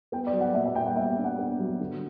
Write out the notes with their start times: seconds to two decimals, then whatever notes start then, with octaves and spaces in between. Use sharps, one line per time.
0.12 B3 G5
0.27 D5
0.33 F#3
0.41 F#5
0.54 A#2 E5
0.65 E5
0.75 A#2 G5
0.86 F#5
0.96 B3 E5
1.18 D4
1.24 F#5
1.39 B3
1.59 F#3
1.80 D3